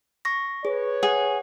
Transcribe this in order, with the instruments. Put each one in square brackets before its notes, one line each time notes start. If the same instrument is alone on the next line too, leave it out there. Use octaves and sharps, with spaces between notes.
[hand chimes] C#6 A#6
[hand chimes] G#4 [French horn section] B4 C#5
[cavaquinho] G#4 [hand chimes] F#5